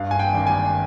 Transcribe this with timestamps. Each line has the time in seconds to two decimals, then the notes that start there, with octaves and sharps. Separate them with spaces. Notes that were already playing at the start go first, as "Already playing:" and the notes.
Already playing: G2 F5
0.11 G#5
0.19 G5
0.34 G#1
0.47 G#5